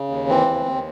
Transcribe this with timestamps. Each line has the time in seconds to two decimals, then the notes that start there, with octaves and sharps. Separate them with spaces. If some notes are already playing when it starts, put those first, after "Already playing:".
Already playing: C#3
0.10 D#2
0.28 E3 C4
0.47 D#2
0.66 D#2